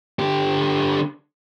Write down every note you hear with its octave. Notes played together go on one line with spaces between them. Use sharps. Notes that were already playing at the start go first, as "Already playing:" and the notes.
D3 G4